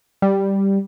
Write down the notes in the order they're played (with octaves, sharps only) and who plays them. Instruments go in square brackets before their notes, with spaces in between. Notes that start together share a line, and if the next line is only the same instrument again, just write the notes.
[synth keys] G3